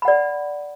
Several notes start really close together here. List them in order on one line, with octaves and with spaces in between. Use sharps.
B5 F#5 D5